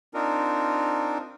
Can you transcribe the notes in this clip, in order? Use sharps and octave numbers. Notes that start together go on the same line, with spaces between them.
C4 D4 D#4 F4 A#4